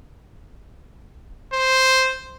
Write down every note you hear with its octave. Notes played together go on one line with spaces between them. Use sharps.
C5